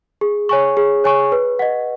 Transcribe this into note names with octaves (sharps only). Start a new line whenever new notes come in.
G#4
C#5 G#5 C#6
G#4
C#5 G#5 C#6
B4
D#5 F#5